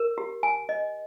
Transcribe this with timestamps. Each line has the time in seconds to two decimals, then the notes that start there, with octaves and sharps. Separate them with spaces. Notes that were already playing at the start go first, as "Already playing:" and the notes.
Already playing: A#4
0.18 G4
0.43 G#5
0.69 D#5